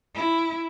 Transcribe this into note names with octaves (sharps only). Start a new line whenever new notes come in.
E4